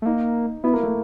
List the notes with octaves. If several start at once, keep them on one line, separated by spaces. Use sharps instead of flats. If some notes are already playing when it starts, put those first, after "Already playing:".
A3
A#3 D#4
B3 E4
A#3
A3